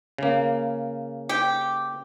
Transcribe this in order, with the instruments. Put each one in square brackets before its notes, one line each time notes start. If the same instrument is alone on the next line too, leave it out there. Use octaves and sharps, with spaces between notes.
[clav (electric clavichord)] C#3 A#3
[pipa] G4